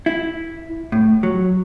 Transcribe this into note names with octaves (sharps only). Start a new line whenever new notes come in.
E4
A2
F#3